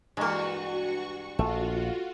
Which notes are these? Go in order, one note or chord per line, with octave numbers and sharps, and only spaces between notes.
G2 E3 G#3 A#3 F#4 C#6
A#1 A3 F4 F#4